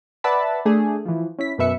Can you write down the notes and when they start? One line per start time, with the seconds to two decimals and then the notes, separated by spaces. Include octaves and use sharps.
0.24 B4 D5 E5 F#5 A5 B5
0.65 A3 D4 G#4
1.05 E3 F3
1.39 C#4 E4 B6
1.58 F#2 B2 B4 E5 C#7